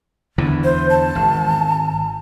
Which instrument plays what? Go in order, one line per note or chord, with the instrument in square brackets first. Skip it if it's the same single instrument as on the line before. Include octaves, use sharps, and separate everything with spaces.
[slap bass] E2 D3 E3
[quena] C5
A5
[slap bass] G#1